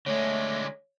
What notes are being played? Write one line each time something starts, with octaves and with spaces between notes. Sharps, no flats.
D3 G#3 A3 C#5